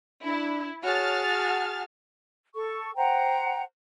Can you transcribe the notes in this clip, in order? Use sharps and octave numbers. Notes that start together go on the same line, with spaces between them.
D4 E4
F#4 G#4 C#5 A5 F6 A6
F#5
A4 C#6
C5 F#5 G5 A#5